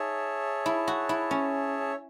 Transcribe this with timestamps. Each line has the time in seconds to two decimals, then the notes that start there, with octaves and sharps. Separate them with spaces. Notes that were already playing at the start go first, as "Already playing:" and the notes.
Already playing: D#4 G#4 C#5 E5 A5
0.66 E4
0.88 F#4
1.09 E4
1.31 C#4